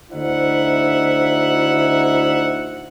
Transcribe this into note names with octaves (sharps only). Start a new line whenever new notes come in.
D2 D#4 E4 C5 E5 F#5